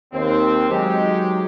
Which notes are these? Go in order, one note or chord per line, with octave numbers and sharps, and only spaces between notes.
D#2 C4
F#3 G#3 D#4 G4